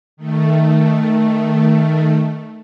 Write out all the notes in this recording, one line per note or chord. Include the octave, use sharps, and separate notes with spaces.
D#3 A3